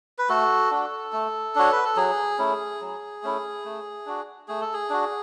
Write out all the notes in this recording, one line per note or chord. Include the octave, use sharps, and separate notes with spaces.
B4
A3 F#4 A4
D4 F#4
A3
D4 F#4 C#5
B4
A4
F#3 G#4
A3 C#4 E4
F#3
A3 C#4 E4
A3
D4 F#4
A3 G#4
A4
G#4
D4 F#4